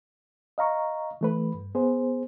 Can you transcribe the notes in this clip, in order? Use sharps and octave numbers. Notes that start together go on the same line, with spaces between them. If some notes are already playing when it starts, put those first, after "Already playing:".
D#5 F5 A#5 C#6
E3 A3 B4
G2
B3 G#4 C5